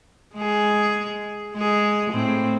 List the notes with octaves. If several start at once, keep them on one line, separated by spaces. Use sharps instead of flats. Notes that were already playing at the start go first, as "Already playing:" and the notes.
G#3 G#4
G#3 G#4
A2 C4